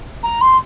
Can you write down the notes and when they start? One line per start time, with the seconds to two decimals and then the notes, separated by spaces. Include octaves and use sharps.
0.23 A#5
0.41 C6